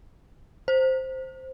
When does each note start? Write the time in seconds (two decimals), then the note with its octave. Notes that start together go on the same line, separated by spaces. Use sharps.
0.68 C5